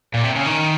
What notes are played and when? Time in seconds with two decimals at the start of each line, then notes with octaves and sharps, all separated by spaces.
0.14 A#2
0.23 C3
0.35 C#3
0.46 D#3